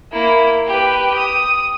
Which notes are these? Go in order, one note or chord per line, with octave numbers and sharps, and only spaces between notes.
A#3 E4
G4 B4
D#6